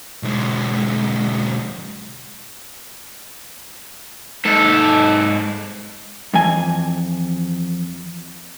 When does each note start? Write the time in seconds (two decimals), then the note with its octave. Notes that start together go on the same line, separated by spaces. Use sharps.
0.23 B1 G#3
4.45 G#2 A4
6.34 F2 E3 G#5